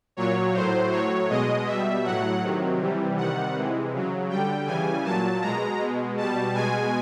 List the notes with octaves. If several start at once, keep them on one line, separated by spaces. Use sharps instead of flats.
A#2 F#3 C#5
A2 F#3 C5
A2 F#3 C#5
B2 G#3 D#5
B2 G3 E5
A2 F#3 F#5
C3 D#3 F#3
C3 E3 G3
C3 D#3 G3 F#5
C3 E3 G#3
C#3 F#3
D3 G3 G5
C#3 E3 G3 G#5
A#2 F#3 A5
B2 G#3 A#5
B2 G#3
B2 G3 A5
B2 G#3 G#5